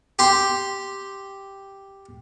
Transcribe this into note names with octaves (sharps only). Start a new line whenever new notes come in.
G4 G5 C6